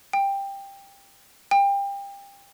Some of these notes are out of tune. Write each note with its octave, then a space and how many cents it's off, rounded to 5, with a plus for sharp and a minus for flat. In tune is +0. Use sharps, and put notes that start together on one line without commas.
G5 +15
G5 +30